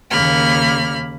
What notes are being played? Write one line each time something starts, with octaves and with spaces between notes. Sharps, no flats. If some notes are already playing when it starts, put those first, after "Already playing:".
D#2 C#3 A#3 B5 F6